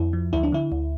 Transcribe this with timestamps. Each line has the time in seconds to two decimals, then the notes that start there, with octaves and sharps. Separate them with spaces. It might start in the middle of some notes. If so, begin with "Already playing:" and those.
Already playing: F2 E4
0.13 F3
0.33 D2 E4
0.43 D4
0.52 D3 E4
0.72 D2